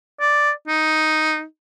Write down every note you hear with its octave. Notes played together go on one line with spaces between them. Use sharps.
D5
D#4